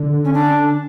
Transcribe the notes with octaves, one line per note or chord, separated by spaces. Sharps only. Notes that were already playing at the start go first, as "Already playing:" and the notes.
Already playing: D3
C#4
D4